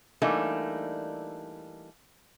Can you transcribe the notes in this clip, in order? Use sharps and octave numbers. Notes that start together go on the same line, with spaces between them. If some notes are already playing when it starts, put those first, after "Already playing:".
E3 G3 A3 A#3 D4 D#4